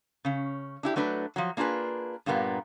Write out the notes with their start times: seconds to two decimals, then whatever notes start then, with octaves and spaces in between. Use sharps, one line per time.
0.25 C#3 C#4
0.83 D4 E4 G4
0.96 F#3 A3 D4 B4
1.36 F3 F#3
1.57 A#3 D4 F4 G#4 B4
2.26 G2 A#2 G3 A#3 B3